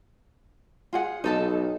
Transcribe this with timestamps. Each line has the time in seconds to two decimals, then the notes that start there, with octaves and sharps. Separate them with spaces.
0.93 F4 G#4 F#5
1.24 B1 D#4 A4 A5